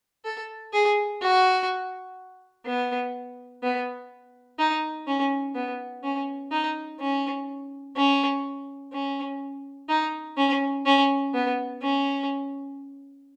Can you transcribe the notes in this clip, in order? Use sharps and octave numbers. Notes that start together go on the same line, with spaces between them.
A4
G#4
F#4
B3
B3
D#4
C#4
B3
C#4
D#4
C#4
C#4
C#4
D#4
C#4
C#4
B3
C#4